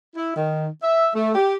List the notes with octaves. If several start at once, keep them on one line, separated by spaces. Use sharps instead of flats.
E4
D#3
E5
A3
G4